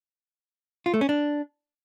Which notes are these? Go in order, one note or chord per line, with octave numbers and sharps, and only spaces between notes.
F4
A3
C#4
D4